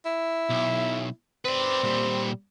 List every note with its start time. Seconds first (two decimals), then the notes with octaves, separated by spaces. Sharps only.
0.05 E4
0.50 B1
1.45 C4 B4 D5
1.83 A#2 G3